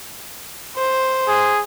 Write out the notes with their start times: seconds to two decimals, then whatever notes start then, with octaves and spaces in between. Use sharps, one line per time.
0.76 C5
1.28 G#4